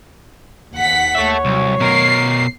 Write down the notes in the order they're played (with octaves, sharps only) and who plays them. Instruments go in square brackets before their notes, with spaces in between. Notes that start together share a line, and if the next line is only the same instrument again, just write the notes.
[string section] D#2 F#5 B6
[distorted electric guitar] A4 E5 [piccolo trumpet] C#5
[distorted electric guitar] C2 [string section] F#3
[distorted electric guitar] B2 A#4 [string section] C7